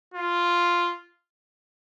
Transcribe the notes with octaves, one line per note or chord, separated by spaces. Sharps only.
F4